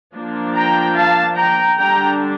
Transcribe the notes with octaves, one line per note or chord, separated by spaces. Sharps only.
F3 A#3 D4
G5 A#5
F5 A5
G5 A#5
D3 G3 D4 G5 A#5